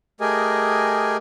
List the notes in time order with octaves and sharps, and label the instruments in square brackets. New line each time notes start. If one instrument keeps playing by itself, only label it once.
[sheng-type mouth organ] A3 G4 G#4 A#4 D#5 G#5